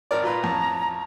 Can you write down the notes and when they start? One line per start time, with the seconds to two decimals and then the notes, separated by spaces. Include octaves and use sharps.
0.11 G#1 A#4 D5
0.23 A#2 F4 B4 A#5
0.42 A1 F2